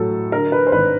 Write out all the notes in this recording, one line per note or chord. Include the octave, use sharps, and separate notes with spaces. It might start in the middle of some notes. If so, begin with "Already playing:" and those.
Already playing: A2 F#3 A4
D3 A#4
B4
C5
G#1 B4